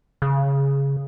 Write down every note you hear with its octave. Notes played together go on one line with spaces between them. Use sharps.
C#3